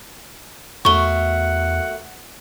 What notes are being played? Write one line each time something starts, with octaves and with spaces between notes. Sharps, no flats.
E2 A3 F#4 A#4 F#5 C#6 G7